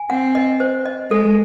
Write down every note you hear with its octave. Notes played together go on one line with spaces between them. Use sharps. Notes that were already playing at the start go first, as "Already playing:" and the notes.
Already playing: G#5
C4 F#5
D#5
C5
D#5
G#3 A4